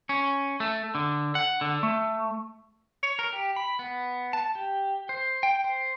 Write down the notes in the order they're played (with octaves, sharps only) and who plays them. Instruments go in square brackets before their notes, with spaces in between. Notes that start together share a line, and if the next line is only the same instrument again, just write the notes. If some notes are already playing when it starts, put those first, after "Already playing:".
[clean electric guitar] C#4
A3
D3
F#5
D3
A3
[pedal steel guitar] C#5
A#4
G4
B5
B3
A5
G4
C5
G5
C5